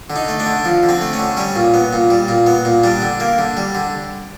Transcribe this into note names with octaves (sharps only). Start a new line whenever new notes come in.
D3
D#4
A3
D4
D3
F3
D3
C4
A3
C#4
D3
G3 C#4
A#2
B3
A#2
G3
A#2
B3
A#2
G3 D4
D3
A#3
D3
G3
D3